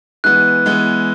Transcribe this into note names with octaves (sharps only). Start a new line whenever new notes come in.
E3 G#3 B3 F#6
E3 G#3 B3